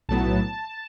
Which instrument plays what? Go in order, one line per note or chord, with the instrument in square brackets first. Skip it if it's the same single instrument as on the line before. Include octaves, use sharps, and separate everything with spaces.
[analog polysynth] B1 A2 F#3 B3 A5